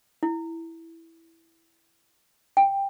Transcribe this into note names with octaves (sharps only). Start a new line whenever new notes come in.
E4
G5